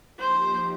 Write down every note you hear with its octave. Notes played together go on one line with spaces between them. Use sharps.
F3 A#3 D#4 G4 C5